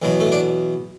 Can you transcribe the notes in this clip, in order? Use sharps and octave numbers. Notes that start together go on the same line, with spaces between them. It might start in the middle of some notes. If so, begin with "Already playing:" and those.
E2 B2 F#3
A3
D4